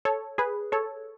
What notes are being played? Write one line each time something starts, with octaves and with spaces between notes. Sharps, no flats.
A4 C#5
G#4 B4
A4 C#5